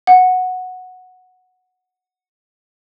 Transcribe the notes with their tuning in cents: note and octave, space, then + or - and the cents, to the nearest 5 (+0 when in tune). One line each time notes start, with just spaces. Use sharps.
F#5 -5